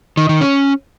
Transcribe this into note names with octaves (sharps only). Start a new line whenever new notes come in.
D#3
D#3
C#4